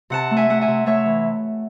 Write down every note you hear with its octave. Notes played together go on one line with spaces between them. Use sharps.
C3 F#5 A5
A3
E5 G#5
A3 F#5
E5 G#5
C3
A3 C#5 E5
E3